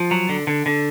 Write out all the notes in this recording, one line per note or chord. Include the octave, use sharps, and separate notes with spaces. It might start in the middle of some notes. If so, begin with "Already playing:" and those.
Already playing: F3
F#3
D3
D3
D3